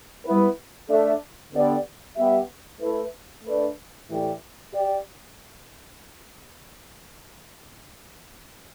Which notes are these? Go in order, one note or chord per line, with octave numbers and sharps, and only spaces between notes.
G3 B3 E4 B4
A3 D4 A4 E5
D3 B3 G4 D5
G3 B3 G4 E5
A3 E4 B4
A3 D4 B4 D5
A2 E3 A3 G4 D5
G4 D5